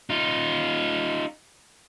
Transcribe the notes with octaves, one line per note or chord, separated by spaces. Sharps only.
D#4 F4